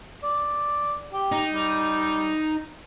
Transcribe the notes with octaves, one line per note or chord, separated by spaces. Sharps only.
D5
G4
D#4
G3